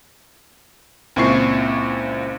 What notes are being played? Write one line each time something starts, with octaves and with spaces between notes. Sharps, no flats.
C#2 A#2 C4 E4 C#6 C7